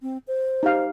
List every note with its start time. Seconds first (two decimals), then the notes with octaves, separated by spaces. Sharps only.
0.02 C4
0.28 C5
0.63 D#4 G4 F5